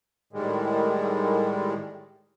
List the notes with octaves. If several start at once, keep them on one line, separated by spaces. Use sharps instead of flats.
A2 D#3 G3 G#3